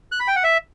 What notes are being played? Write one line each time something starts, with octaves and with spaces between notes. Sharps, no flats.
F#6
B5
G5
F#5
E5